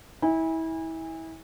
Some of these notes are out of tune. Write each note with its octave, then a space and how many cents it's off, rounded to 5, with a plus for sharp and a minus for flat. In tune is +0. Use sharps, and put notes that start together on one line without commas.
E4 -30 G#5 -30